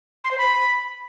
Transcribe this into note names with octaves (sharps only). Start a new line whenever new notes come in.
C6
C5
B5